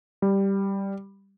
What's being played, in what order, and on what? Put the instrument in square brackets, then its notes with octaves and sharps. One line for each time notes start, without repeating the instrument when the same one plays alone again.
[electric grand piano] G3